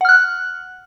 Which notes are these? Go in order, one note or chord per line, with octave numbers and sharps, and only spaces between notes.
F#5 F6 F#6